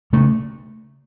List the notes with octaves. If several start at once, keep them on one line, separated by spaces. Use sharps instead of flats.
C#3 A3